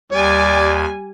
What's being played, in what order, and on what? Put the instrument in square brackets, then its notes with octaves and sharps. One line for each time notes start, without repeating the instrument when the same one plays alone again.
[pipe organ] D#2 [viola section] G3 G#5 [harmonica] D5